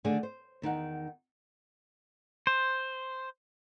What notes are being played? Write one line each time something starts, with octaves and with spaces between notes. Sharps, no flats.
D3 D#3 A3 G#4 D5 G#5
C5
E2 D#3 D#4 F#5
C5